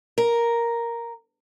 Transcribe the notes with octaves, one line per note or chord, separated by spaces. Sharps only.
A#4